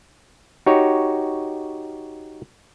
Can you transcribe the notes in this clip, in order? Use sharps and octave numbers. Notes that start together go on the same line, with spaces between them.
D#4 F#4 G4 C#5